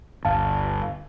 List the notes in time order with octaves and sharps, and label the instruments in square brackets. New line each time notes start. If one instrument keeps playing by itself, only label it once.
[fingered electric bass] G1 [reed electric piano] D2 F5 A5